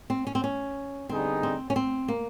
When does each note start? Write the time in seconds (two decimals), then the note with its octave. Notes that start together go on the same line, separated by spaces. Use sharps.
0.10 C4
0.27 C#4
0.35 C4
0.44 C#4
1.09 D3 G3 B3 C4 D#4 G#4
1.43 C4
1.70 C#4
1.76 C4
2.08 A#3